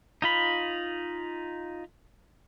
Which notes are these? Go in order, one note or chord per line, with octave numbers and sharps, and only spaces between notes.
D#4 F4 B5